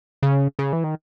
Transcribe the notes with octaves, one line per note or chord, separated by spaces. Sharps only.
C#3
C#3
E3
D#3